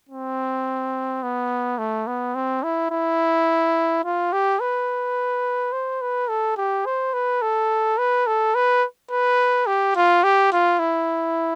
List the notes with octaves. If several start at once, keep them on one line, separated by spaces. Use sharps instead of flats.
C4
B3
A3
B3
C4
E4
E4
F4
G4
B4
C5
B4
A4
G4
C5
B4
A4
B4
A4
B4
B4
G4
F4
G4
F4
E4